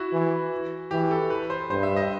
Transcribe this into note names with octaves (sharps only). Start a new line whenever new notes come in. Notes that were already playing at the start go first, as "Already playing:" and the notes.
Already playing: E4 F#4
E3
E3 G4
A4
B4
C5
G2 C5
E5
D#5